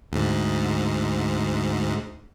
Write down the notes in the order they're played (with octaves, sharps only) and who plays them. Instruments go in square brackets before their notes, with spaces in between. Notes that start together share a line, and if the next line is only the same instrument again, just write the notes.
[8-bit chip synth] D2 G#2